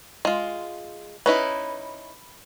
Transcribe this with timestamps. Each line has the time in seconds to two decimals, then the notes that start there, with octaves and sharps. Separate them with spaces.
0.25 G#3 F4
1.26 C#4 D#4 E4 B4